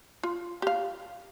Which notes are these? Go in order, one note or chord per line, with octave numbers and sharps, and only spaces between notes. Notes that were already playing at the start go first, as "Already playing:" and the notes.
F4
G4 F5